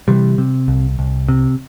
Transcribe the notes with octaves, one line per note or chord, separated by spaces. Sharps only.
C3 E3 G3
C3
C2
C2
C3